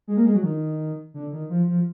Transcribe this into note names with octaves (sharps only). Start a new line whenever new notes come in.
G#3
A#3
G#3
F#3
D#3
D3
D#3
F3
F3